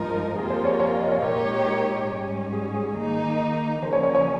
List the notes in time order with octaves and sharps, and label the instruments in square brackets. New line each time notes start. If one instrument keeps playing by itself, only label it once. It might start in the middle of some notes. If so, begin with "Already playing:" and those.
Already playing: [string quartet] G2 F3 G#3 D#4 A#4
[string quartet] F2 C3 F3 A#3 F4 [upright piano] G#4
[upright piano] C5
C#5
C#5
F5
D#5
C#5
[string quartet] A#2 G#3 D#4 G4 C#5 [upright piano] A#4
[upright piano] A#4
[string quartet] G#2 G3 C#4
[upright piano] G#4
G#4
[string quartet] D#3 A#3 D#4
[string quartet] C#3 F3 A#3 C#4 [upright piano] C5
[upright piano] C#5
C#5
C#5